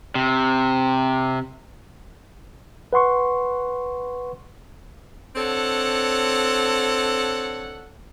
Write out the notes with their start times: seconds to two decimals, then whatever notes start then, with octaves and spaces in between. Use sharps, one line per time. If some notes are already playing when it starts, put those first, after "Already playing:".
0.15 C3
2.93 B4 F#5 C6 C#6
5.36 C4 D4 A4 C#5 F#5